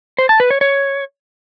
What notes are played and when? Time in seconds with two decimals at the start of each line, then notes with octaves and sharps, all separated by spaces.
0.19 C5
0.29 A5
0.40 B4
0.50 C#5
0.61 C#5